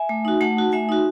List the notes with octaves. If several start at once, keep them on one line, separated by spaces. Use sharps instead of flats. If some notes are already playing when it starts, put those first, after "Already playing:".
Already playing: E5 G#5
A3
D#4 F#4
A3 F#5 A5
D#4 F#4
A3 E5 G#5
D#4 F#4